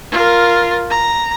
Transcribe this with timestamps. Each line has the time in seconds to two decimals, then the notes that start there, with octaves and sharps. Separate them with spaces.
0.11 F4 A#4
0.90 A#5